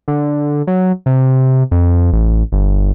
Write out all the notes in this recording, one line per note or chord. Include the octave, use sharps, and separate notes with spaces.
D3
F#3
C3
F2
A1
G1